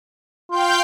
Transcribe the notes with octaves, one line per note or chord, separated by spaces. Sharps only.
F4 F5 G5 G6